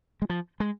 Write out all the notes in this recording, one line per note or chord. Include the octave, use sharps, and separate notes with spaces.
G#3
F3
G#3